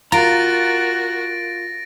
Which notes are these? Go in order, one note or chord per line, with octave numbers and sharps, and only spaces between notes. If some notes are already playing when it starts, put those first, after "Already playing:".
F4 F#4 A#4 A#5 A6 A#6 D7